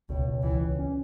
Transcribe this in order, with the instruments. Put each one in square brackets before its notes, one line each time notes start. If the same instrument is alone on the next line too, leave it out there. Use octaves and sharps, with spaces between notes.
[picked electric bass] C#2 [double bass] B2
[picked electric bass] C#2
[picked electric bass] C#2 [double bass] E3
[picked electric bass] C#2
C#4